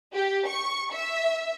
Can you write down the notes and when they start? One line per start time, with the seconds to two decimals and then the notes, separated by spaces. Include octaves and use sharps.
0.14 G4
0.47 C#6
0.93 E5